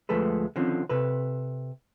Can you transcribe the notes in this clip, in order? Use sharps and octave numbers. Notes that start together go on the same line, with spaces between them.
D2 F3 G#3 A3 A4 B4
D3 D#3 F3 C4 C#4
C3 A4 B4